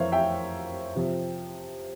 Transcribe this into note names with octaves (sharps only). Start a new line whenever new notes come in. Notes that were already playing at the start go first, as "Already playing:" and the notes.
Already playing: F2 E3 A#4 C5 C#5 E5 F5
E5 G5
C3 F3